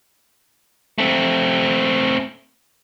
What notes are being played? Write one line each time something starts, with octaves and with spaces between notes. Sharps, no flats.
A3 C4